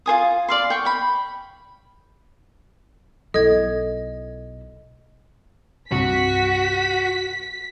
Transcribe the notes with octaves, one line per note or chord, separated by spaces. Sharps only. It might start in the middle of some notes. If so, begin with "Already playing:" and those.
F4 C5 G#5 D#6
D5 F5 C6
G5 C#6
G5 B5
B1 E4 A4 D#5 G#6
C2 G2 C3 F#4 B6